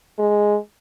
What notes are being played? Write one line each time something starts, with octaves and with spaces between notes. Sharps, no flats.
G#3